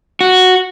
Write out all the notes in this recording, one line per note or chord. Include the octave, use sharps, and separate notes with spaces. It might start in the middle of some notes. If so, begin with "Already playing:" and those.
F#4